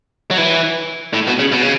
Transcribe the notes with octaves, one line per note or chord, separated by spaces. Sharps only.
F#3
E3
A2
B2
C#3
B2
C#3